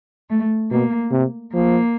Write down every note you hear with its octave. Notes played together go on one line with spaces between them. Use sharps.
A3
B2 A#3
C3
F3 A#3